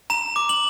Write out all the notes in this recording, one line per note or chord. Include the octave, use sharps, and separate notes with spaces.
A#5 E7
D6
F#7